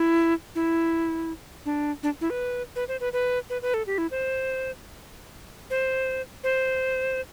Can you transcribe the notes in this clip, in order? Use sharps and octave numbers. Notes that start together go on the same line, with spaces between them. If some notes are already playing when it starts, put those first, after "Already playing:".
Already playing: E4
E4
D4
D4
E4
B4
B4
C5
B4
B4
B4
B4
A4
G4
E4
C5
C5
C5